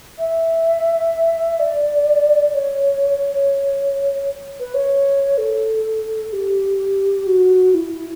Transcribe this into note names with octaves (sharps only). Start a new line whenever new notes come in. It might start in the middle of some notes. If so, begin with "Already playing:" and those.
E5
D5
C#5
B4
C#5
A4
G4
F#4
E4